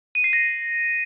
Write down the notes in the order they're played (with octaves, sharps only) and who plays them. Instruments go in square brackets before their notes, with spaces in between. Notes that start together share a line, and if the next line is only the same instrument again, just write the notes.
[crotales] D#7
C7
A#6